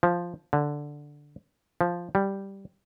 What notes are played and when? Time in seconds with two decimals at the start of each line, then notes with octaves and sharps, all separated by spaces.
0.03 F3
0.53 D3
1.81 F3
2.15 G3